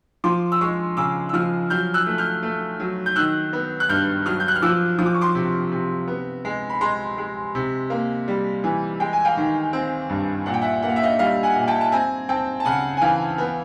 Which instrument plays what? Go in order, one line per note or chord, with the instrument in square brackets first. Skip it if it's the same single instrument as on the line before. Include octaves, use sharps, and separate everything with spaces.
[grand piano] F3 C6 D6
E6
G#3 C#6 D#6
C#3 D6 E6
E6
F3 D#6 F6
F#3 F6 G6
E6 F#6
A3
F6 G6
A3
F#3
G6
D#3 E6 F#6
B3
F#6
G2 F6 G6
F#3 D#6 F6
G6
F#6
F6
F3 D6 E6
F3 D#6
D6
C#6
C6 D6
C3
C3
B3
G#3
B5
G#3 A#5 C6
G#3
C3
A#3
G3
E3
G#3 G5
G#5
F5 G5
D#3
C4
G2
A#2 F#5
G5
E5 F#5
A#3 F#5
F5
E5
D#5 F5
G3 D#5 F5
F#5 G#5
A#2
G5 A5
A5
C4 G#5 A#5
C4 G5 A5
A5
C#3 F#5 G#5
G#5
E3 F5 G5
B3